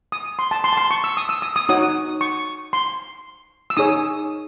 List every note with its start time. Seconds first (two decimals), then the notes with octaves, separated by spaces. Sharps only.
0.12 D#6
0.39 C6
0.51 A5
0.64 C6
0.73 A5
0.77 C6
0.91 C#6
1.04 E6
1.17 D#6
1.29 E6
1.42 D#6
1.56 D#6
1.69 D#4 F#4 C#5 D#6
2.21 C#6
2.73 C6
3.70 E6
3.77 D#4 G#4 C#5 D#6